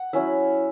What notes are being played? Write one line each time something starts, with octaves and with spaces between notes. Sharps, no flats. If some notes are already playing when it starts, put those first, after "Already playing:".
Already playing: F#5
F#3 C#4 E4 E5